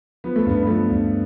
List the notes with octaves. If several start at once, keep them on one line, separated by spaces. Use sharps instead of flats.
F3 B3
A3
G2 B3
B3
F3 A3
G2